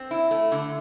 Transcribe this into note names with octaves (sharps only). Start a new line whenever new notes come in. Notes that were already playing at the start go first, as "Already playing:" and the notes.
Already playing: C4
E4
A3
D3